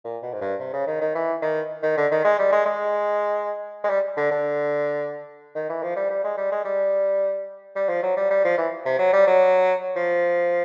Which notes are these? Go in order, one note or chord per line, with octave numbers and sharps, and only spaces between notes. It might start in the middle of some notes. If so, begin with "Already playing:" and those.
A#2
B2
G#2
G2
C3
C#3
D#3
D#3
E3
D#3
D#3
D3
D#3
G#3
G3
G#3
G#3
G#3
G3
D3
D3
D#3
E3
F3
G3
G3
G#3
G3
G#3
G3
G3
F3
F#3
G3
G3
F3
E3
C3
F#3
G3
F#3
F3